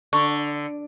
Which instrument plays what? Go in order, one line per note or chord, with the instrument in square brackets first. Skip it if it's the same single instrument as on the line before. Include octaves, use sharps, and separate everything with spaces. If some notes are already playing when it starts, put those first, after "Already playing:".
[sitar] D3 [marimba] C#6